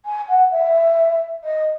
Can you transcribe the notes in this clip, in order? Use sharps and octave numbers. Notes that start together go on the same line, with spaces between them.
G#5
F#5
E5
D#5